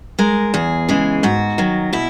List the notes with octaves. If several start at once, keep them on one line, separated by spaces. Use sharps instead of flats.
G#3 A#4
E2 G#4
C#3 E3 G#3
G#2 F#4
D#3 F#3
B2 E4